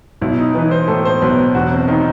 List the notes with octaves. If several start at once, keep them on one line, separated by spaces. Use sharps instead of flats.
B1 E4
D#4
E3 B4
C5
A2 A4
C5
B1 B4
E1 F#4
C4
D#3 D#4